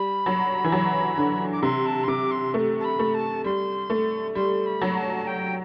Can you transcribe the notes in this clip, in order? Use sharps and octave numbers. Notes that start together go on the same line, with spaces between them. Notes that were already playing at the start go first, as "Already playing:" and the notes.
Already playing: G3 B5
F#3
E3
F#3
D3
D6
C3 C6
A5
C6
C3 D6
C6
A3
A5
B5
A3
A5
G3 C6
A3
G3 C6
B5
F#3
A5
G5